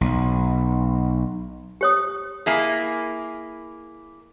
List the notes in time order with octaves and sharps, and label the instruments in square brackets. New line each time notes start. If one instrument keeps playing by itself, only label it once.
[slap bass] B1
[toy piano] G4 C#5 D#6
[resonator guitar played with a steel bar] A#3 E4 G#4